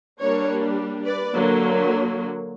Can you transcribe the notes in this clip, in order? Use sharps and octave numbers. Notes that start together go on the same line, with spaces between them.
G3 A#3 D4 A#4 C#5
B4 D5
D3 F#3 A#3